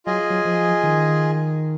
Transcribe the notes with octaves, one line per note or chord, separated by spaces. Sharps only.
F#3 F4 G#4 D#5 G#5
F#3
F3
D#3